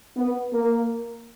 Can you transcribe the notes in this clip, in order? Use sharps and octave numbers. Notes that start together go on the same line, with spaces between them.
B3
A#3